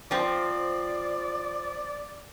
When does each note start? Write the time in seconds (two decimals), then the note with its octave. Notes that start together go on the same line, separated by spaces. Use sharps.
0.11 F3 C4 D5